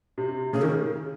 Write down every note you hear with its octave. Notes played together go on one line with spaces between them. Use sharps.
C3
C#3 G#4
D#3 A#4